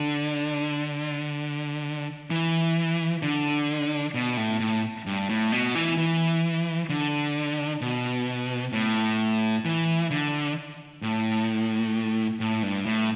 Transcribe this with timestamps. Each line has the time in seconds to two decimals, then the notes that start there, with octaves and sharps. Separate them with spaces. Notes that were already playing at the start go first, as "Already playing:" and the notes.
Already playing: D3
2.30 E3
3.22 D3
4.14 B2
4.37 A2
4.60 A2
5.06 G2
5.29 A2
5.52 B2
5.75 E3
5.97 E3
6.89 D3
7.81 B2
8.73 A2
9.65 E3
10.11 D3
11.02 A2
12.40 A2
12.63 G2
12.86 A2